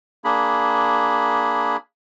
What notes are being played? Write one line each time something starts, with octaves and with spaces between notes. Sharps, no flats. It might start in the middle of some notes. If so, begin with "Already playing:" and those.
A#3 D4 G#4 B5